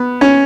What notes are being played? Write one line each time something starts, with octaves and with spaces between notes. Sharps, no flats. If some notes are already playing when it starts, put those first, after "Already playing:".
Already playing: B3
C#4